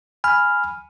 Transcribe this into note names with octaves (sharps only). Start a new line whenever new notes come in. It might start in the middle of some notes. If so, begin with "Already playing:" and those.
G#5 B5 F6